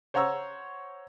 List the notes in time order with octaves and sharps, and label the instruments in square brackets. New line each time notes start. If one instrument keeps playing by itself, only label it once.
[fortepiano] C5 C#5 F#5 A#5 C#6 E6